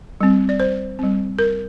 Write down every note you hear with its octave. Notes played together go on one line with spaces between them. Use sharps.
G3 C4
D5
C5
G3 C4
A#4